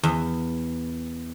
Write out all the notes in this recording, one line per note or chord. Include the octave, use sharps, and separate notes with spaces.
E2